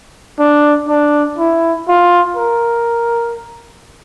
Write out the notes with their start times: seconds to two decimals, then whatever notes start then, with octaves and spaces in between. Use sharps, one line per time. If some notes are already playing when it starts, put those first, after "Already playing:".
0.39 D4
0.88 D4
1.38 E4
1.88 F4
2.37 A#4